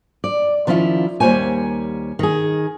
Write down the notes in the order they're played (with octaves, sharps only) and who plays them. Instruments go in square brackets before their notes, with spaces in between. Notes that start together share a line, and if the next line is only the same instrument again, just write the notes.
[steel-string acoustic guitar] D5
D#3 F3 C#4 E4 F4
D#2 G3 A#3 C5 C#5 G#5
D#3 G#4